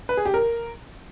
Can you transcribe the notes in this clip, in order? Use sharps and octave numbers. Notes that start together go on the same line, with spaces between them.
B4
G#4
G4
A#4